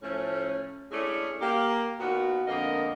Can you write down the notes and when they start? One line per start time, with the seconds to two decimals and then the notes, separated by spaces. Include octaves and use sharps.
0.02 A2 F3 A3 C#4
0.91 G#3 A3 C#4 D4 E4 D5
1.41 A#3 G4
2.00 A#2 D#3 B3 F#4
2.47 F2 D3 A#3 B3 A#4 D#5